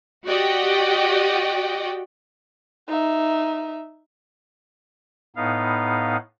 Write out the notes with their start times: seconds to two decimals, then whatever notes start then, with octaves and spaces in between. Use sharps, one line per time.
0.27 F#4 G4 D5 D#5 F#5 G5
2.88 D#4 E5
5.36 A2 B3 D#4 F5